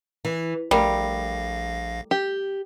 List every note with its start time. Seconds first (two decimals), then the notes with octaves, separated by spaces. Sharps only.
0.25 E3
0.71 A#1 G3 A3 A#4 F5 A#6
2.11 G4